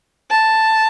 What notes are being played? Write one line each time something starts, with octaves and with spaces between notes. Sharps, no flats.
A5